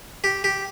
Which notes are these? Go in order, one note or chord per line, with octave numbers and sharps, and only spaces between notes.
G4
G4